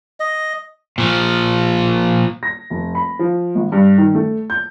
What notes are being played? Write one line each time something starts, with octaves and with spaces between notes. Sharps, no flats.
D#5
A#2 F3
A#6
F1
B5
F3
G#1
G2
D#3
A3
G6